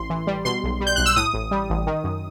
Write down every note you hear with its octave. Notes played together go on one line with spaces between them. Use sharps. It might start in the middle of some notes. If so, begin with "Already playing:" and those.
Already playing: A1 A2 C6
E3
G3
B2 C6
B1
G3
G6
B1 F#6
E6
A2 D#6
A1
G3
A1
D#3
F#2